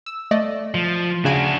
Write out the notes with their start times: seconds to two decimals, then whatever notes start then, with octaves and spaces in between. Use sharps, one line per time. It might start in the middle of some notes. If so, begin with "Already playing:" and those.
0.06 E6
0.31 A3 D5 D#5
0.74 F3
1.25 C#3 D4 F#4 G#5 D7